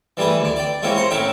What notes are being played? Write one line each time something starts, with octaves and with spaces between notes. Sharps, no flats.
E3 G3 A3 G#4 B4
D2 D4
D5 G5
G#3 A#3 C4 C#4 E4 G4
C5 F#5 A#5
A2 C#3 A#4 C#5 E5 G5